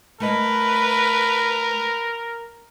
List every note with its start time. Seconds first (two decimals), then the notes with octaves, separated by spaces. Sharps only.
0.20 A3 E4 A#4 B4 D#5